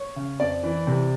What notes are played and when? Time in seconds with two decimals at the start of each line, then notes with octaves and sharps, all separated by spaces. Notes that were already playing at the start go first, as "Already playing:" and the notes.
Already playing: C#5
0.16 C#3
0.40 F2 D5
0.63 E3
0.87 C3